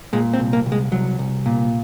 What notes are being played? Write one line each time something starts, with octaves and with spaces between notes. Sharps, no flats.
A#2 G#3
C4
C2
A#3
C2
G#3
C2 F#3
C2
A#2